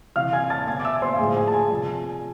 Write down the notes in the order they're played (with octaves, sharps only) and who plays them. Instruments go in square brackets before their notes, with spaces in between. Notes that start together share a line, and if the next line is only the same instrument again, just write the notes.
[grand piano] C3 E3 F5 F6
G#5 G#6
A5 A6
B2 G#5 G#6
D6
E5 E6
C5 C6
F5
A2 F3 G#4 G#5
G#4 G#5
A5
G#4 G#5
C3 F3